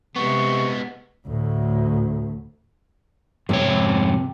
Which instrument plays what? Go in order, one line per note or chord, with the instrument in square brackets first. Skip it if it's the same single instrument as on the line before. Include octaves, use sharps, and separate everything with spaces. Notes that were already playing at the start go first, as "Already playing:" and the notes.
[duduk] C3 [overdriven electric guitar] G#3 B3 [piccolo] C#6
[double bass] D2 A2
[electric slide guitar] F2 G#2 C#5 [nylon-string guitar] C3